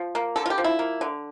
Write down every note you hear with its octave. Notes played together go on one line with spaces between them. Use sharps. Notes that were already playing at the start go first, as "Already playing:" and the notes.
Already playing: F3
A#3
D3 A4
F4
G4
F3
E4
A#3
D3